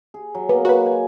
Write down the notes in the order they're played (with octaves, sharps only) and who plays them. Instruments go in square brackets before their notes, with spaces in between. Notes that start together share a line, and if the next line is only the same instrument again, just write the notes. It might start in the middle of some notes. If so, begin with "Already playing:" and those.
[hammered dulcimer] G#4
F#3
[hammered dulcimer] A#3 D#5 [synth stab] B3
[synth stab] F#4 B4
[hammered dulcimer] G#5